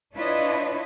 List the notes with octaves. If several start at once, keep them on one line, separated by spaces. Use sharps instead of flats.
D4 E4 F4 B4 C#5 D#5